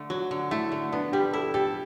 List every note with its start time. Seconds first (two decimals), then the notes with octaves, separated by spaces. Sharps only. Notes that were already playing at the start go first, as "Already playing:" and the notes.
Already playing: D3 A3
0.10 F#3 F#4
0.31 D3
0.51 A3 E4
0.72 D3
0.92 B3 D4
1.13 G3 G4
1.33 E4 A4
1.54 G4 A4